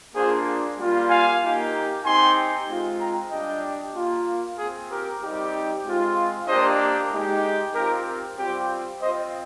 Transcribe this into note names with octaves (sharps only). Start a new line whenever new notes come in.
A#3 D4 F4 G#4 C5
G3 A#3 F4
F5 G#5
A#3 D#4 G4
C4 D#4 G4 G#5 C6
G#3 C4 F4
G5 A#5
G3 D4 G4 D#5 G5
A#3 F4
C4 F4 G#4
G4 A#4
G3 C4 D#4 G4
G#3 C4 F4
A#3 D4 G4 C5 D#5
G#3 D#4 G4
C4 F4 G4 A#4
G3 C4 F4 G4
C4 F4 C5 D#5